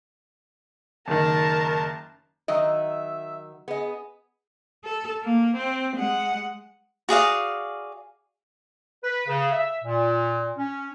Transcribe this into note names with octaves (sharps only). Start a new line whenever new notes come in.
F#1 D#3 A#4 A5
D#3 F#3 D#5 E5
B3 G#4 D#5
A4
A#3
C4
G#3 F#5
F#4 G#4 D5 F5
B4
C#3
E5
A#2
C#4